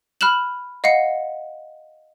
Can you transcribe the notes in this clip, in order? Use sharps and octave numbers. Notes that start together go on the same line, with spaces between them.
B5 F6 F#6 E7 F#7
D#5 F5 F#5 C#7